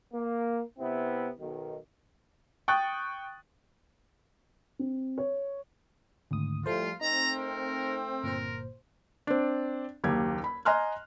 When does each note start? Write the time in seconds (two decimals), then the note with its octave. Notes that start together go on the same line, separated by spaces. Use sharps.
0.13 A#3
0.78 C3 B3 C4 E4
1.39 B1 D#3
2.68 G5 C#6 D#6 F#6 A6
4.79 C4
5.18 C#5
6.31 G#1 D2 D#6
6.66 A2 F3 G3 A3 F4 C5
7.01 A3 C4 D#4 A#5
7.38 A#4
8.23 G1 A#2 A#4 C5
9.27 C4 D4
10.04 F#1 D#2 G4 G#6
10.44 B5
10.65 D#5 G#5 A#5 C6 F6 F#6